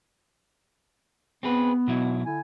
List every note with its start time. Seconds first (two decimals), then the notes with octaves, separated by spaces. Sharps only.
1.43 B3 C4 G#4 B4
1.88 B2 F#3 E4
2.24 D3 E4 G#5